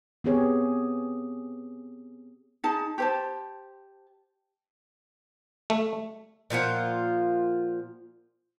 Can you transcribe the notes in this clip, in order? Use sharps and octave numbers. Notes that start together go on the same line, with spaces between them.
B3 C4 G4 G#4 C#5
D#4 G#4 A5
G4 C5 A5
A3
A#2 F3 F4 F#5